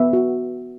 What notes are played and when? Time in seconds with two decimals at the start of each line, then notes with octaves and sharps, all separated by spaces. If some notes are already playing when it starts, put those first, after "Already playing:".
Already playing: B3 E5
0.13 F#4